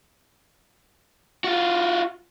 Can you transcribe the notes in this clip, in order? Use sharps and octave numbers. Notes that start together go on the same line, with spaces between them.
F4 F#4